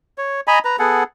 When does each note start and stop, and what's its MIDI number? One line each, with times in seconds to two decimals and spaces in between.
0.18 0.41 73
0.47 0.59 75
0.47 0.59 80
0.47 0.59 82
0.47 0.59 83
0.65 0.77 71
0.65 0.77 82
0.79 1.04 59
0.79 1.04 68
0.79 1.04 69
0.79 1.04 78